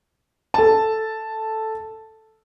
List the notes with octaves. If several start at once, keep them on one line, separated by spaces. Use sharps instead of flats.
A4 A5